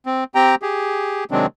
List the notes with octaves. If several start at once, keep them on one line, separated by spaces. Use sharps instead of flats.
C4
C4 G4 G5 A#5
G4 G#4
C3 D#3 F#3 G#3 C4 D4